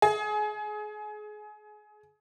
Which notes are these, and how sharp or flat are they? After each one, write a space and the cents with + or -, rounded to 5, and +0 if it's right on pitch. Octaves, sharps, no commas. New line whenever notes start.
G#4 +25